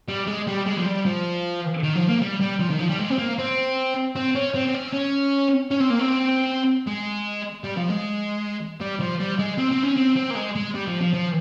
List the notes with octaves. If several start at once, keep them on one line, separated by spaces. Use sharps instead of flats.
G3
G#3
G3
G#3
F3
G3
F3
D#3
F3
A#3
G3
G3
F3
D#3
F3
G3
G#3
C4
A#3
C4
C4
C#4
C4
C4
C#4
C4
C#4
C#4
C4
A#3
C4
G#3
G3
F3
G#3
G3
F3
G3
G#3
C4
C4
C#4
C4
C4
A#3
G#3
G#3
G3
F3
F3
F3